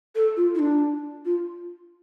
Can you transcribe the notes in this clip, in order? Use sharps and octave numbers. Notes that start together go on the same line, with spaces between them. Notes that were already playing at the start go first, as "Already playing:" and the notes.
A4
F4
E4
D4
F4